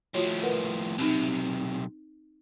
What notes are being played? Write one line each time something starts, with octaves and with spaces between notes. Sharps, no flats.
A2 F3 F4 F#4 C#5
A#4 B4 F#5
B1 C3 C4 D#4